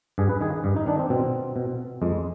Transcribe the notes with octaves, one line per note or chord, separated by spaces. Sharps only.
G2 G#4
B4
D#3 G#4
G2
D#4
D#3 D4
C4
B2 C4
B2
F2 G#3